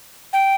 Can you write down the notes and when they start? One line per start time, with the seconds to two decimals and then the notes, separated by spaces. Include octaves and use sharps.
0.33 G5